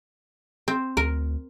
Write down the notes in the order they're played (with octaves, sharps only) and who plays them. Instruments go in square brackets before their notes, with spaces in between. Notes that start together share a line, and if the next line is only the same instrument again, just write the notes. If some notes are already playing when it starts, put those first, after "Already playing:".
[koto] C4
[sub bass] D2 [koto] A#4